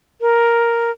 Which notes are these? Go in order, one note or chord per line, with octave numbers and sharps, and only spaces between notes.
A#4